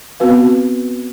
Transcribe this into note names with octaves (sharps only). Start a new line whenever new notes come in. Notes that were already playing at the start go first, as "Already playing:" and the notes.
B3 C4 F#4 B4 F5